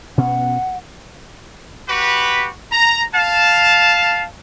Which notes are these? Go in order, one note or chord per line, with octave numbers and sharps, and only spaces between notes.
B2 B3 C#4 F#5
F#4 G4 B4
A#5
F5 A5